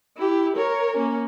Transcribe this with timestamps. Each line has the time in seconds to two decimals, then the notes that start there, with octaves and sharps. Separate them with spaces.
0.17 E4 G4
0.56 A#4 C#5
0.96 A#3 C#4